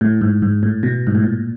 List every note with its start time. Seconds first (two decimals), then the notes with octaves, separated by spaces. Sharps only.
0.01 A2
0.21 G#2
0.42 G#2
0.63 A2
0.83 B2
1.07 G#2
1.15 A2
1.23 A#2